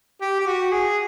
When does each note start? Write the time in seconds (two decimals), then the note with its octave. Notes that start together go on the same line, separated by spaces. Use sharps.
0.21 G4
0.40 G4
0.47 F#4
0.72 G#4